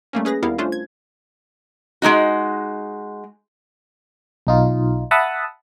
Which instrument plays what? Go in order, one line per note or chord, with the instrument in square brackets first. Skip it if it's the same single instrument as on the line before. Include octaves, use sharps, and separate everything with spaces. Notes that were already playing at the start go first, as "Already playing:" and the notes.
[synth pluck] G3 A3 A#3 C#4
C#4 G#4 B4 A#6
D#2 G3 B3 E4 A#4 F5
A3 C#4 D4 F4 C5
G#6
[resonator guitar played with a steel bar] G#3 C#4 D#4 F#4
[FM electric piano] B1 D#4 F4
E5 F#5 A5 B5 D#6